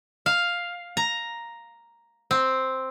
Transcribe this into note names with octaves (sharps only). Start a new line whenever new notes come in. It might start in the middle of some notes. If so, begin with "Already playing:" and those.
F5
A#5
C4